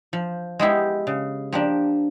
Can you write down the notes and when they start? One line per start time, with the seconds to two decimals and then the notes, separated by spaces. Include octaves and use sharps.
0.13 F3
0.59 G#3 B3 E4 G4
1.07 C#3
1.52 F3 A#3 D4 G4